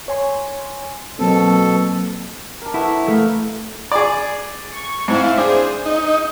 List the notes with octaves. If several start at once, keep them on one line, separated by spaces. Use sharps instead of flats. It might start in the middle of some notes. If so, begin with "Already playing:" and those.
C#5 G#5 C6
B2 F#3 A#3 C4 A4
D4 A#4
A3 B3 E4 E7
C#5
A3 A#4 F5
G#4 D5
C#6
G#2 C4 E4 F5
D4 G#4 C5
D#4